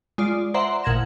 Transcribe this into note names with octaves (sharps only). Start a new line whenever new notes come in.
G#3 F4 D5
C5 D5 E5 F#5 A#5 C6
A1 A#2 F#5 G#6 A#6 E7